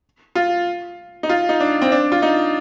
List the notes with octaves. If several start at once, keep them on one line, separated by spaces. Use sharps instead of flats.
F4
D#4
F4
D#4
D4
C4
D4
F4
D#4